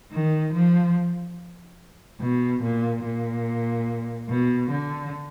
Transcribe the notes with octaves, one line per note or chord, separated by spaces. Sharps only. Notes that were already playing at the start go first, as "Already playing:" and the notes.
D#3
F3
B2
A#2
A#2
B2
D3